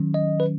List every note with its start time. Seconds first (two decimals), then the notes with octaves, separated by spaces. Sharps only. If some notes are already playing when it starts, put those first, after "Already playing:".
Already playing: D#3 F#3 C#4
0.14 D#5
0.40 B4